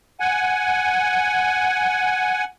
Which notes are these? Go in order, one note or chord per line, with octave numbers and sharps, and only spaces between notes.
F#5 G#5